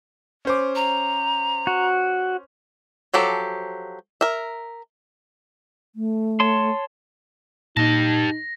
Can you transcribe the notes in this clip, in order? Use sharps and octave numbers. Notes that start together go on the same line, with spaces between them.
C#4 C5 D6
A#5
F#4
F3 F#3 G4 A4
A#4 E5
A3
C#5 A5 C6
A#2 D#4 G4 A5 A#6